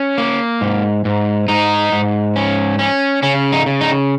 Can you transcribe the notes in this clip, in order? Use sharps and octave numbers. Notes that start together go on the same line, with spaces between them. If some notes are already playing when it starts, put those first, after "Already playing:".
Already playing: C#4
A#3
G#2
G#2
G#2 D#4
G#2
C#4
C#4
C#3 C#4
D#4
C#3
D#4